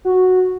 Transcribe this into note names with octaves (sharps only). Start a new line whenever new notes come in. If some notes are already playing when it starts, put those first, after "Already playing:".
F#4